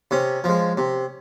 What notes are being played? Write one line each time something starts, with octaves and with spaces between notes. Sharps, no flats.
C3 C#4
F3 G#3
C3